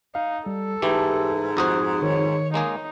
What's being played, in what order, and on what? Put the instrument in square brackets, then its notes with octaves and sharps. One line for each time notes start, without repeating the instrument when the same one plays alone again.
[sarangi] D#4 [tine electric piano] F5
[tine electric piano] G3 [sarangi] A4
[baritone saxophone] G#2 [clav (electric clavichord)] E3 A3 [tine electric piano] G4 A5
[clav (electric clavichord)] F2 F#4 C5 [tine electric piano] A#5 D#6 F#6
[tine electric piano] D#3 [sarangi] C#5
[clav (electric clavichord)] G#3 A#3 G#4 [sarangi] D#4